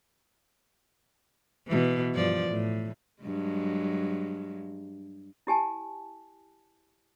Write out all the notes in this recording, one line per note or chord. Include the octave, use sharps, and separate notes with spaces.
B2 E3
G2 F3 D5
A2
G2 F#3 G#3
E4 G4 G#5 A5